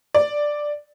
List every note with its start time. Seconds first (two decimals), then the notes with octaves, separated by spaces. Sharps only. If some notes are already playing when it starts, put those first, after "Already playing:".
0.14 D5